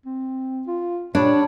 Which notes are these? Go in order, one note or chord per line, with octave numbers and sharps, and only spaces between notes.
C4
F4
A#2 G3 D4 C#5